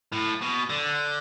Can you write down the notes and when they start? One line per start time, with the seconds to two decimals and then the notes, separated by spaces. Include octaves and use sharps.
0.12 A2
0.41 B2
0.70 D3